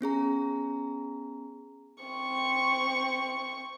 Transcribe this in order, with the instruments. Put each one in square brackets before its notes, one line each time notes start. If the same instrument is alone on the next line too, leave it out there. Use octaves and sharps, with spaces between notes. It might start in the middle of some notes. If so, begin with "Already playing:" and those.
[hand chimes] B3 C#4 G#4 A#5
[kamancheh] C4 C#6